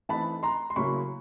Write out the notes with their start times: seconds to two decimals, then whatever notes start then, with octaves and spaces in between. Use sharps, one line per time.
0.09 E3 A3 C4 D#4 A5 B5
0.43 A#5 C6
0.70 C6
0.76 C#3 F#3 A#3 C#4 E4 B5 C#6